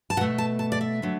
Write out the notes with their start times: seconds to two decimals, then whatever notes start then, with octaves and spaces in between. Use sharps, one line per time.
0.10 A5
0.17 B2 F#5
0.21 A3
0.38 A5
0.59 A5
0.72 D5
0.81 E5
1.02 D3 F#3